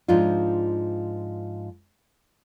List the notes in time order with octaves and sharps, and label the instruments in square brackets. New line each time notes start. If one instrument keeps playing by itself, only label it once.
[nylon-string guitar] G#2 F3 D4 D#4 F4